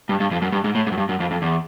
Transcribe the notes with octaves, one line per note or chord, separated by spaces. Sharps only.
G2
G2
F2
F#2
G2
G#2
A2
G#2
F#2
G2
F#2
F2
F2
E2